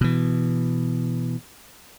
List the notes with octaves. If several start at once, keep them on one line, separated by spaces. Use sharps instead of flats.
B2 E3